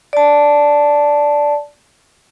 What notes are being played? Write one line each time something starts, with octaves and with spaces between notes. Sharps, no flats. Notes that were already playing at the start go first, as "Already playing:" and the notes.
D5 A5